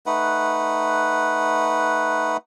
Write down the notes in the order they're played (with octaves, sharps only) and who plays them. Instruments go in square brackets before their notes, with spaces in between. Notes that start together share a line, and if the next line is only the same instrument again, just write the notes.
[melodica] A3 D#4 B4 F#5